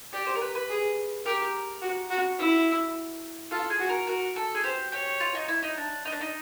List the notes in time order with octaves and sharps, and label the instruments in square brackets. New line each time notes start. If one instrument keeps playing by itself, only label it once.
[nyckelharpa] G4 [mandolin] D5
[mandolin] C5
A#4
B4
B4
[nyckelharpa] G#4
[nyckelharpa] G4 [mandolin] A#4
[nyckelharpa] F#4
F#4
E4
[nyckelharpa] F4 [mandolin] A4
[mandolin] G#4
[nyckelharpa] F#4
[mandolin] A#4
[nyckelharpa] F#4 [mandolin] A#4
[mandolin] A4
G#4
[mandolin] G4 [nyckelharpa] C5
[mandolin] G4 [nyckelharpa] C#5
[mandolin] F4
D#4
E4
D#4
D4
D#4
D4
D#4